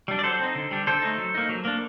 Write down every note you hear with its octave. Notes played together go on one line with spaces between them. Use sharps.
G3 D4
D5
F#3 A4 C5
C4 D#4
D3
G3 D4
D3 A4 C5
A3 D#4
F#3
A#3 D#4
F#3
A#3 D4